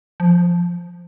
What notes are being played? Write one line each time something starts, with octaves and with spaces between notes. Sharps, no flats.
F3